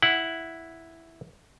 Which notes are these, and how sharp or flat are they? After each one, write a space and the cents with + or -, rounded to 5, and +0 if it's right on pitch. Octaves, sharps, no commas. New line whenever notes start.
E4 +0 F#5 +0